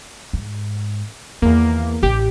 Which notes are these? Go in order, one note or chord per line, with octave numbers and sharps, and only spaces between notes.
G#2
E2 D#3 A#3
A1 G4